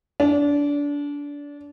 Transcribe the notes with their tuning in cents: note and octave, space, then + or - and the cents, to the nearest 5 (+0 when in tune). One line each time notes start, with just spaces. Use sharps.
D4 -25